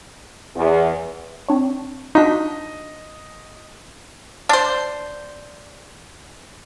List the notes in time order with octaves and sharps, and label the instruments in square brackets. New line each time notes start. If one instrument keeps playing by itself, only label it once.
[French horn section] E2
[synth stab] C4 D4 C#5
[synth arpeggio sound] D4 D#4 [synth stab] F4 F#4 B6 [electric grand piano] D#5
[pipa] D4 C5